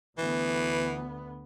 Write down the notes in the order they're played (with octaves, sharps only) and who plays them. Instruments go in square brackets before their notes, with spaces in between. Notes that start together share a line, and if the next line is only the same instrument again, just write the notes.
[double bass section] D2 B3 [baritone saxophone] E3